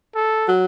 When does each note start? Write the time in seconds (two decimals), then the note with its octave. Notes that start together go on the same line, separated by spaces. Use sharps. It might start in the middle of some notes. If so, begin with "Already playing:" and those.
0.15 A4
0.48 F#3